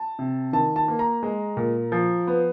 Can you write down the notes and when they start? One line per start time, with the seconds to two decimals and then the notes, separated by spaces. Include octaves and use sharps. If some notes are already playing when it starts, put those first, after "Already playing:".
Already playing: A5
0.19 C3
0.53 D#3 A5
0.76 A5
0.88 A#3
0.99 A#5
1.23 G#3
1.57 A#2
1.92 F3
2.27 B3